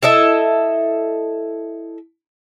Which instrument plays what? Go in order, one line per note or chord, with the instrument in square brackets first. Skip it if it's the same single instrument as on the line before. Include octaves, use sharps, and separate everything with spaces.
[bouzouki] E4 A4 D#5 E5